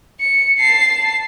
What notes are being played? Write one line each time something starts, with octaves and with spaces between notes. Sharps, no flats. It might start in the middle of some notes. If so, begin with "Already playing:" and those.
C#7
A5 C7